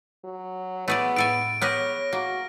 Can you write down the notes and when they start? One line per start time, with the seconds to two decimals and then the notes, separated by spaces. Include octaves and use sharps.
0.24 F#3
0.88 A3 B3 G#4 D5
1.16 A2 A4 G#5 D7
1.61 B3 G4 G#4 C#5 F6 A#6
2.13 A#3 F#4